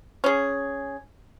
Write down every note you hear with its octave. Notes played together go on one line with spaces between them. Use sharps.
C#4 G#4